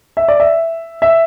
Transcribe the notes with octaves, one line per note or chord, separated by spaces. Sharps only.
E5
D5
E5
E5